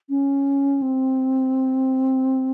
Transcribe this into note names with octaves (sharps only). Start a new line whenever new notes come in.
C#4
C4